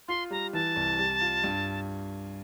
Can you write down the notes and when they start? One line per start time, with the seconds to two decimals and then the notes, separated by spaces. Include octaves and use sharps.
0.08 F4 C6
0.31 G3 A#5
0.53 E3 A5
0.76 C2
0.99 G3
1.21 F4
1.44 G2